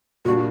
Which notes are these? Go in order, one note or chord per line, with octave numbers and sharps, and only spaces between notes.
A#2 G3 D4 F#4